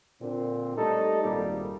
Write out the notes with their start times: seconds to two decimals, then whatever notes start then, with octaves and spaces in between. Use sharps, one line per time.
0.21 A#2 D3 C4
0.77 G3 A3 D#4 A4
1.24 G#1 A#2 G3 A#3 G4 A#4